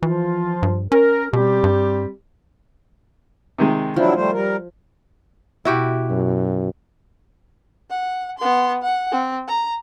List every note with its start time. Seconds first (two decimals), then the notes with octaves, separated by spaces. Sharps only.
0.03 E3 F3 F4
0.63 G2
0.92 C#4 A#4
1.33 B2 G3 C4 G4
1.64 G2
3.58 C3 D#3 G#3
3.96 F3 F#3 D4 E4
4.15 G3 A3 C5
4.32 G3 A#4
5.65 B2 E4 F#4 G4
6.10 F#2
7.90 F#5
8.38 B3 C6
8.82 F#5
9.12 C4
9.48 A#5